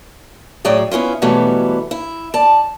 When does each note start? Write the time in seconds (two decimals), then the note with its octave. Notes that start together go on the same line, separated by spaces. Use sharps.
0.65 A2 F#3 G#4 D5 G5
0.91 B3 C#4 E4 F4
1.22 B2 E3 F#3 G3 A3 B3
1.91 E4
2.34 D5 A5